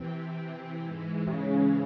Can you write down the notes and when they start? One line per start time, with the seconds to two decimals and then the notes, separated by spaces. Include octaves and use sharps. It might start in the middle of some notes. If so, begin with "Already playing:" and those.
Already playing: C3 E3 C4
0.85 G#2 E3 G#3
1.27 C3
1.31 C#3